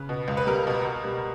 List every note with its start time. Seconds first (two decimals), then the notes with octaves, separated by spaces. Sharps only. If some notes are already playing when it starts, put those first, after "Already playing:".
Already playing: C#3 B4
0.09 B2
0.28 C#2
0.37 B4
0.47 G3 A#4
0.67 B2
0.85 B2
1.04 G3